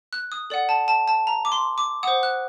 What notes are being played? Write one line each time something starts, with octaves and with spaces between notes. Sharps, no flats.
F#6
D#6
A4 D5 F#5
A5
A5
A5
A#5
D6
C6
D6
C5 F#5 D#6
F#6